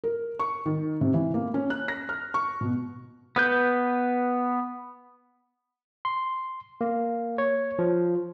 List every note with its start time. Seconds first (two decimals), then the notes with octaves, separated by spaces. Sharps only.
0.04 A#4
0.39 C#6
0.66 D#3
1.01 C3
1.14 E3
1.34 A#3
1.54 C#4
1.70 F#6
1.88 A#6
2.09 F6
2.34 C#6
2.61 B2
3.36 B3 B4 G6
6.05 C6
6.81 A#3
7.38 C#5
7.79 F3